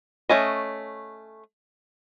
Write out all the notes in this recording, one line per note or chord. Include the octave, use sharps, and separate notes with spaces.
A3 C#4 D#5